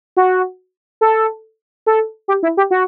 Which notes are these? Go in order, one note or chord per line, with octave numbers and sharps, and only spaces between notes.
F#4
A4
A4
G4
E4
G4
F#4